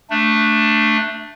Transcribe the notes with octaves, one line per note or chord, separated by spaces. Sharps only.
A3 D4